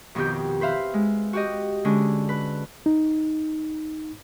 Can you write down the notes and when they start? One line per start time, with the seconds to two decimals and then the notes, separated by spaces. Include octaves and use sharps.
0.15 F2 B2 D#3 G4 G6
0.61 B4 C5 E5 F5
0.94 G#3
1.33 F#4 G4 D#5
1.85 D3 G#3 C#4
2.29 B4
2.86 D#4